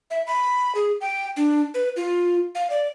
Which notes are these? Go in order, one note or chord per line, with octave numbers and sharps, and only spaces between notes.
E5
B5
G#4
G5
D4
B4
F4
F5
D5